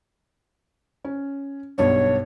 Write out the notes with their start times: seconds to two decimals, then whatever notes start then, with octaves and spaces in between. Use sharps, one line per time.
1.05 C#4
1.78 B1 G2 B3 C#5